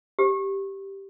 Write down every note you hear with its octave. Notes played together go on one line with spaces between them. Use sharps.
G4